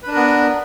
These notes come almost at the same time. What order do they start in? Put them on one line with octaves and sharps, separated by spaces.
B4 D4 A#4 B3